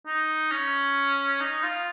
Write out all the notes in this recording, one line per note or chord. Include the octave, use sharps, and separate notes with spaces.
D#4
C#4
D#4
F4